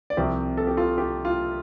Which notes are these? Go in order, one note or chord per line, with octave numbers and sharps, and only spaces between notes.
D5
C2 C3 F3 C4 G4 C5
A4
G4
F4 A4
G4
F4